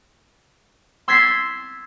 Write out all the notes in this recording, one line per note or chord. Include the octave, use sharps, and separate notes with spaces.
C6 E6 G#6 A6 B6 C7